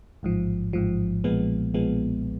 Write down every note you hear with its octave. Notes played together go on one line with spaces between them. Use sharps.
A1 G#2 F3
A1 G#2 F3
B1 A#2 F3 G#3 B3
B1 A#2 F3 G#3 B3